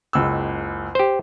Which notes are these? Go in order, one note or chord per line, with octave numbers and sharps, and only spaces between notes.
F#1 C#2 E6
G4 C5